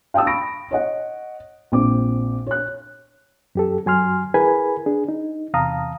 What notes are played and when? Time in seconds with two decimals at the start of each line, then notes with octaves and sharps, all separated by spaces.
0.14 F5 G5 A5 D#6 E6
0.27 B5 C#6 A#6 D7
0.71 C#5 D#5 F#5
1.72 A#1 C4 D6
2.46 C#5 F#6
3.55 F#2 G4 A4
3.85 F#2 F#3 G#5 C6 F6
4.34 E4 G#4 A#4 B4 G#5 B5
4.86 D4 G#4
5.08 D#4
5.54 E2 C3 F5 A5 A#5 D#6